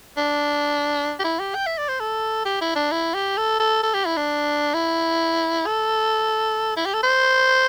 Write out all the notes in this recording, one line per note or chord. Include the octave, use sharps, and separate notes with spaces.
D4
G4
E4
G4
G5
E5
D5
C5
A4
G4
E4
D4
E4
G4
A4
A4
A4
G4
E4
D4
E4
A4
E4
G4
A4
C5